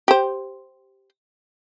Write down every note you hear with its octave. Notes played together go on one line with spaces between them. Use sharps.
G4 C5